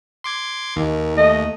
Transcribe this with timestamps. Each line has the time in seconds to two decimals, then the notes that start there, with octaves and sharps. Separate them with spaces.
0.24 C6 D6 G#6
0.77 D#2 D#3
1.17 A3 D#5